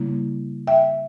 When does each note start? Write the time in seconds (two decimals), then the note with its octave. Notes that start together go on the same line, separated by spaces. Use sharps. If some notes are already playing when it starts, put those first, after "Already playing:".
Already playing: C#3 G3 A#3 E4
0.67 E5 G5